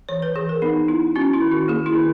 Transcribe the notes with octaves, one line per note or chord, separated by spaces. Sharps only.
E3 C#5
B4
E3 G#4
A#4
B3 D#4
B3 E4
C#4 F#4
E4
D#3
F#4
A#3 G#4
E4
D#3